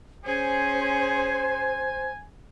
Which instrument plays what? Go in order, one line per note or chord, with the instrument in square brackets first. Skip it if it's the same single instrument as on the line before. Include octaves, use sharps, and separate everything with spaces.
[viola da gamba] C#4 G#4 [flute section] C5 [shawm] G#5